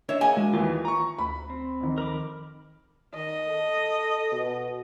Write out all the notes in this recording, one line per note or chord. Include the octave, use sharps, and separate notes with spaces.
D4 C#5 D#5 E5
A#3 G#4 D#5 G#5
G#3 F#4
D#2 E3 F4
A#5 C#6
D2 B5
C4
F2 D#3
A#4 B5 D6
D#3 D#5
A4
B2